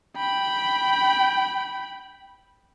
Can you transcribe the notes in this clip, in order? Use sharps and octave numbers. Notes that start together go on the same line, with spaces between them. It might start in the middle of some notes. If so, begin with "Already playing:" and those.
G5 B5